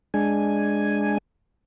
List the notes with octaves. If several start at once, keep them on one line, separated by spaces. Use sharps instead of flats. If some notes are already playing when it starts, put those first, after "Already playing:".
G#3 D4 G#5